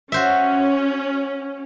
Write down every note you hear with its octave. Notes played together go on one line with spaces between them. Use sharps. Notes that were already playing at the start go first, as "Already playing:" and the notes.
C#4 F#4 C5 E5